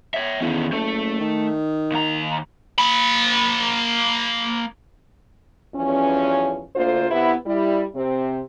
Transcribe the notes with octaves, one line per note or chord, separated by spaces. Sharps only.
C#5 E5
E2 D#3 C#4
F#1 A3 A4
D#3
D#2 A#5
A#3 B5
E2 G2 F3 C#4
D2 D3 A#3 F4 C5
C3 B3 E4
G3 E4
C3 C4